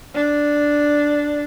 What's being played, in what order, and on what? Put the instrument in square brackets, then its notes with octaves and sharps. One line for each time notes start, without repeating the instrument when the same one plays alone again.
[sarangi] D4